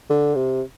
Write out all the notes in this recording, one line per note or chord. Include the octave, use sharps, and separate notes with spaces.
D3
C3